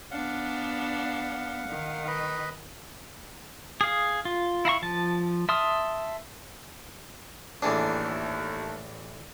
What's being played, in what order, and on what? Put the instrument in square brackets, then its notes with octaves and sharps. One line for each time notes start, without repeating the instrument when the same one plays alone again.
[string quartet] B3 D4 [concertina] F5 F#5
[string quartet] D#3
[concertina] B4 D#5 B5
[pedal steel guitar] G#4 F5
F4
E4 F5 A#5 C#6
F3 A5
E5 A5 C6 D#6 F6
[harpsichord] A1 E3 G#4 [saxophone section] D#2 A3 [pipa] D4